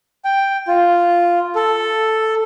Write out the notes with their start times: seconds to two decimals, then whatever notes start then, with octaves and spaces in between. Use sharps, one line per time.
0.25 G5
0.68 F4
1.55 A4